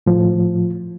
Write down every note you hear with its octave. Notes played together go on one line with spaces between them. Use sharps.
A2 F3